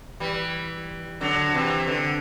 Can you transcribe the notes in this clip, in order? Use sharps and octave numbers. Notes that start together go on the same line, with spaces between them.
E3 G3
D3 F#3
C3 E3
D3